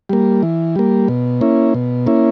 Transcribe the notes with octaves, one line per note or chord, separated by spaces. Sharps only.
G3 A#3
E3
G3 A#3
B2
A#3 C#4 E4
B2
A#3 C#4 E4